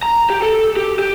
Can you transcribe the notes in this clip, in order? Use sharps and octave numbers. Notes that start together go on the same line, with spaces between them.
A#5
G4
A4
G4
G4